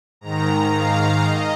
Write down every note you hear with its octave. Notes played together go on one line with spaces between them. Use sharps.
G#2 D#3 A#5
F5
D#5